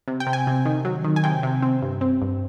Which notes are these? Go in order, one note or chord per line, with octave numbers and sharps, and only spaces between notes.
C3
G5
C3
G#5
C3
D#3
F#3
D#3
G#5
C3 G5
C3
C4
G2
C4
G2